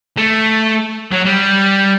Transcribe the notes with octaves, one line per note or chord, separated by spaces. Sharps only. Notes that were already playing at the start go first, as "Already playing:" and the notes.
A3
F#3
G3